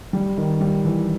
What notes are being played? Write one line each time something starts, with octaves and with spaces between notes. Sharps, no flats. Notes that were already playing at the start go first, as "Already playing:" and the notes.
G3
D#3
G3
E3